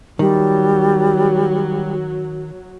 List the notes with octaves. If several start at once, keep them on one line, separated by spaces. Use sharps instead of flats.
D#3 F#3 G3